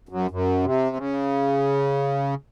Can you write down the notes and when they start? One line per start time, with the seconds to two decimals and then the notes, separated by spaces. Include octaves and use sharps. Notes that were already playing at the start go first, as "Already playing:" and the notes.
0.09 F#2
0.31 F#2
0.64 C3
0.96 C#3